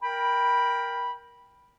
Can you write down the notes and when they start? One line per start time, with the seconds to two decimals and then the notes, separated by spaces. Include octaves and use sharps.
0.01 A#4 G5 B5